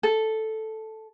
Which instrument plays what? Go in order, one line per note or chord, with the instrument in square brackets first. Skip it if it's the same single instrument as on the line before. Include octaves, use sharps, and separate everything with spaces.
[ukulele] A4